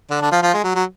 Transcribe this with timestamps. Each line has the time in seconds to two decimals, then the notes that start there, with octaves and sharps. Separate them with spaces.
0.10 D3 D4
0.21 D3 D4
0.31 F3 F4
0.42 F3 F4
0.53 G#3
0.63 F#3
0.75 F#3